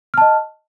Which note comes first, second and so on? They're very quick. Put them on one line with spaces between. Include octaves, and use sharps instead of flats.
F6 A5 D#5